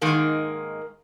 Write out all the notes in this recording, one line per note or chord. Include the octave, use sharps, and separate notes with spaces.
G#2 D#3 G#3 A#3